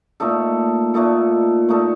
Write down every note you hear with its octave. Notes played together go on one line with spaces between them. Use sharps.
A#2 A3 D#4 A4
A#2 A3 D#4 A4
A#2 A3 D#4 A4